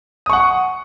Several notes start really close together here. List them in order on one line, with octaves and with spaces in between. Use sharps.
D#6 C#6 F#5